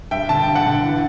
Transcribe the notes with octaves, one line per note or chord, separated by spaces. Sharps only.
G2 E5 G5
D3 A5
G2 G5
F#5 A5
D3
E3